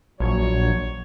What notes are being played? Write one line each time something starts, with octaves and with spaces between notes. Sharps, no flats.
A#1 F#3 C#5